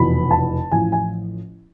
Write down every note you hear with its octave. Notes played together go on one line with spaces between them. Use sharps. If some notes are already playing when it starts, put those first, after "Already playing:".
Already playing: F1 E2 B2 B5
A5
A1 A2 F3 G#5
G#5